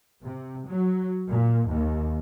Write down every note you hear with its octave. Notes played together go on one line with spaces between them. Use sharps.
C3
F#3
A#2
D#2